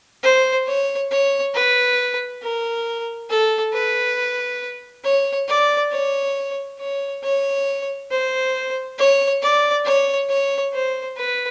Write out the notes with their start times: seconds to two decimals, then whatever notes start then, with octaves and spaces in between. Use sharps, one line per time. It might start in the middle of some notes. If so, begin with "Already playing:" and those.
0.23 C5
0.66 C#5
1.11 C#5
1.54 B4
2.42 A#4
3.29 A4
3.73 B4
5.04 C#5
5.48 D5
5.92 C#5
6.79 C#5
7.23 C#5
8.11 C5
8.98 C#5
9.42 D5
9.85 C#5
10.29 C#5
10.73 C5
11.17 B4